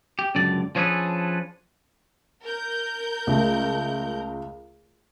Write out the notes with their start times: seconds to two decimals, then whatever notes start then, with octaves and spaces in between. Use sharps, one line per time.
0.19 G4
0.35 C#2 F#2 D3 D5
0.76 F3 C#4 D4 G#4 A4 B4
2.43 A#4 G6
3.27 C#2 A3